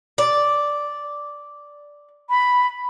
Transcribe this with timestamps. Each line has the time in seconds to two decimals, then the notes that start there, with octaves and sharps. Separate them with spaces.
0.18 D5
2.30 B5